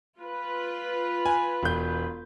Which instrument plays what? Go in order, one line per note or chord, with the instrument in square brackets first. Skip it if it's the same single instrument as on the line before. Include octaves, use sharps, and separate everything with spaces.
[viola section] F4 B4
[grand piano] G#5
E1 G6